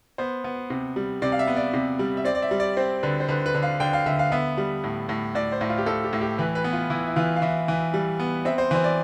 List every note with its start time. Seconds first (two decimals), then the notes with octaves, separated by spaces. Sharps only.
0.18 B3 C5
0.44 B3
0.70 C3
0.96 G3
1.22 C3 D5
1.32 F5
1.39 E5
1.47 B3
1.56 D5
1.74 C3
1.99 G3
2.17 E5
2.25 C4 D5
2.35 D5
2.42 E5
2.51 G3
2.60 D5
2.77 C4 C5
3.03 D3 B4
3.20 C5
3.28 D3 B4
3.46 B4
3.55 D3
3.63 F5
3.80 D3 G5
3.93 F5
4.06 D3 E5
4.19 F5
4.32 B3 E5
4.58 G3
4.84 A2
5.09 A2
5.35 A2 D5
5.52 C5
5.61 A2
5.69 F4
5.78 G4
5.86 A2 A4
6.04 G4
6.13 A2
6.21 G4
6.38 E3 B4
6.55 B4
6.64 B3
6.73 F4
6.90 E3 E4
7.07 E4
7.16 E3 F4
7.36 F5
7.42 E3 E5
7.68 E3
7.94 G3
8.19 B3
8.45 C4 E5
8.58 C5
8.71 E3 C5
8.84 D5